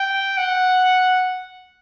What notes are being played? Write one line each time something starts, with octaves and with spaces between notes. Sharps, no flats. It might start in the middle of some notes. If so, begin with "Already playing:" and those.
Already playing: G5
F#5